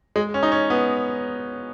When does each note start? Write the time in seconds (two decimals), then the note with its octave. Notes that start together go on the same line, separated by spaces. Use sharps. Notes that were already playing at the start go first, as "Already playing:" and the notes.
0.16 G#3
0.34 C#4
0.43 D#4
0.52 C#4
0.70 B3